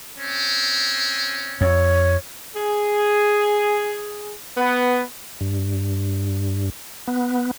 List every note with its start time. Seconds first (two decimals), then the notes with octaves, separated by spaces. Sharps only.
0.17 C4 C#4
1.61 F2 C#5
2.56 G#4
4.57 B3
5.41 G2
7.07 B3